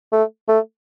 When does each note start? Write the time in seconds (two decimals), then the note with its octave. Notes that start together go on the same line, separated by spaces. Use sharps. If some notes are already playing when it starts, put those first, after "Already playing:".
0.12 A3
0.48 A3